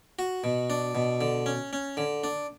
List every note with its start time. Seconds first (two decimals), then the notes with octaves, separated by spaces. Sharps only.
0.19 F#4
0.44 B2
0.70 D4
0.95 B2
1.21 D3
1.46 C#4
1.73 C#4
1.97 D3
2.24 D4